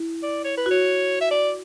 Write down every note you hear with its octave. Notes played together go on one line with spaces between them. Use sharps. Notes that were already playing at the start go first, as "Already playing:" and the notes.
Already playing: E4
D5
C#5
B4
F#4 C#5
E5
D5